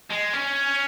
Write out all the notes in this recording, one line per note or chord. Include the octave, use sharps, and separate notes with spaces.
G#3
C#4